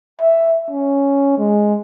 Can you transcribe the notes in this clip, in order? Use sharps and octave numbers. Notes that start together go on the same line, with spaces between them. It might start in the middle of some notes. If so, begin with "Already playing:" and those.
E5
C#4
G#3